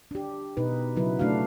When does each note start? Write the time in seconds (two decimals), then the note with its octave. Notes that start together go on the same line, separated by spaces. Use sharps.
0.11 D4 G4
0.57 B2 D#4 B4
0.96 C#3 F#3 E4 B4
1.19 A3 D4 F#4 F5